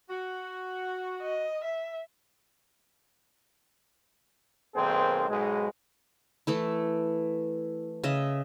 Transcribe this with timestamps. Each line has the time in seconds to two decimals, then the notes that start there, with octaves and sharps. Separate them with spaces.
0.10 F#4
1.22 D#5
1.64 E5
4.75 B1 D#3 A#3 C4 G#4 C5
5.28 B1 G#2 B2 G#3
6.47 E3 A3 E4
8.04 C#3 D#5 E5